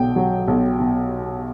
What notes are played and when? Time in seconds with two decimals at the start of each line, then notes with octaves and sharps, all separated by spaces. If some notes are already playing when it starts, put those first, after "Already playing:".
Already playing: B1 B2 G5
0.16 F#3
0.48 B1
0.80 B2